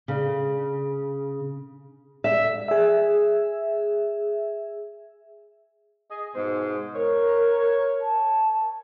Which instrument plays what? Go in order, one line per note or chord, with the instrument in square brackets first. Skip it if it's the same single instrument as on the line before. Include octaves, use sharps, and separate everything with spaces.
[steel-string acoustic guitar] C#3
E5
[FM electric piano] G#4 E5
[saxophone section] G#4 D#5
G#2 B2 C5
[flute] A#4 [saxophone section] C#5
[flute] A5